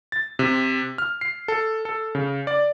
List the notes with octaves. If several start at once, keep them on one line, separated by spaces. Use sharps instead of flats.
A6
C3
F6
C7
A4
A4
C#3
D5